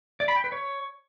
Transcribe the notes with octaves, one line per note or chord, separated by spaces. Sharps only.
D5
B5
G5
B4
C#5